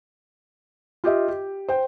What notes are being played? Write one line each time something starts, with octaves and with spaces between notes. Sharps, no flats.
F4 G4 D#5 E5
G4
C5 G5